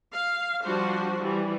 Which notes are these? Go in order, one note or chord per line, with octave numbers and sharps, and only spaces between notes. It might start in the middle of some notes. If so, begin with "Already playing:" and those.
F5
F3 G3 D4 F#4 C5
E3 G3